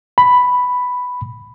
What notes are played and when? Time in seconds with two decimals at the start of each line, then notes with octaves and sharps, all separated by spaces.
0.18 B5